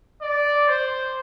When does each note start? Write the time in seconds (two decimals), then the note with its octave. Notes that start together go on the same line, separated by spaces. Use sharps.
0.22 D5
0.68 C5